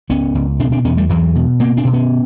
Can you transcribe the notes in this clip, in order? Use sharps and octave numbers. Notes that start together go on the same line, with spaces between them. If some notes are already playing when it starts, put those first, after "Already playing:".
C#2 B3 C#4
C#2
B2 C4 D4
C4 D4
E2 B3 C#4
G3 A3
E2 E3 F#3
B2
B2 A#3 C4
C4 D4
B2
B3 C#4